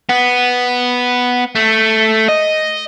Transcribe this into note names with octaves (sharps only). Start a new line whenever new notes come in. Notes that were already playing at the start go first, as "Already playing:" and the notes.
B3
A3
D#5